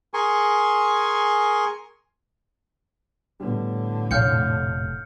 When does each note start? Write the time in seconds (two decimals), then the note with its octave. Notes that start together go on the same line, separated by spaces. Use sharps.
0.14 G#4 A#4 G#5 C6 C#6
3.40 A2 D3 G3 B3
4.11 F1 A#2 C#5 F5 G5 F6 G6 C#7